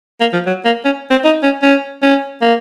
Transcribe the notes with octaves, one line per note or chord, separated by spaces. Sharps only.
A#3
F3
F#3
A#3
C#4
C4
D#4
C#4
C#4
C#4
A#3